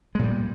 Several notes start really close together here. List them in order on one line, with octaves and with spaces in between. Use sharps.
G#3 A#2 G3